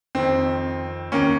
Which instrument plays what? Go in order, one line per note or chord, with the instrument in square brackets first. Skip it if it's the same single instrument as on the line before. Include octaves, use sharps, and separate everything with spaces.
[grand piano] F2 D#3 C4
D#2 D#3 A#3 C#4